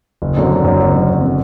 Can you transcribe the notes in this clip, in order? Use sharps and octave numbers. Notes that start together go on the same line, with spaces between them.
F#1
F#2 D3 F#3 C4
F#1
F#2 D3 F#3 C4
F#1
F#2 D3 F#3 C4
F#1
D3 F#3 C4